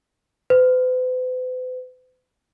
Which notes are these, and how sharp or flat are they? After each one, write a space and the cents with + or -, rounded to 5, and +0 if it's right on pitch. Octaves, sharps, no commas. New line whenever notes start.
B4 +45